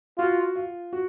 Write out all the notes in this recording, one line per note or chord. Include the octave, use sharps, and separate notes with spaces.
F4 F#4
F4
F#4